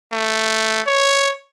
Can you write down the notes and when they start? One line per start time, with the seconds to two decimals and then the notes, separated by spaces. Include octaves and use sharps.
0.12 A3
0.87 C#5